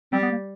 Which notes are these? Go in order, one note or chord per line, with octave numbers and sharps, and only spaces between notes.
G3 C4
B3
A#3